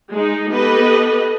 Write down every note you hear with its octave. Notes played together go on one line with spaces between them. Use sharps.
G#3 D#4
B3 G4 A4 B4 D#5